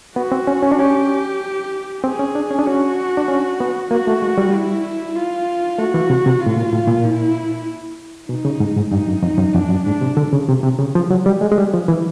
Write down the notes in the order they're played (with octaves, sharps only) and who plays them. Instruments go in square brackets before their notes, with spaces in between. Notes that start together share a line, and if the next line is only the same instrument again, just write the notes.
[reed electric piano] B3 [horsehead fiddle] F#4
[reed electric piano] C4
C#4
C#4
D4
[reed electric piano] C#4 [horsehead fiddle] G4
[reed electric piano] C4 [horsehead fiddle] G#4
[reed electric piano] C#4
D4
C#4
D4
[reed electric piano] C#4 [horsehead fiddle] F#4
[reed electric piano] D4
C#4
B3
[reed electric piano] A#3 [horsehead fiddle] F#4
[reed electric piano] A3
G#3
G3
[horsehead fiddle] E4
F4
[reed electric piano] A3 [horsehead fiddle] F#4
[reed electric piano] E3
C3
C3
[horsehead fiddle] F4
[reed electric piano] A2
A#2
A2
A#2
[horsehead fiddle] E4
[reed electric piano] B2 [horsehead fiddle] D#4
[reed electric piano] C#3
G#2
G#2
[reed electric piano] G2 [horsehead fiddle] D#4
[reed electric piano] F#2
F2
F#2
[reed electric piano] F2 [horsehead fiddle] D4
[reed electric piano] F#2
[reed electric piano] G#2 [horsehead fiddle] D4
[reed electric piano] C3
D3
C#3
C3
C3
C#3
F3
F#3
G3
G#3
G#3
G3
F3
E3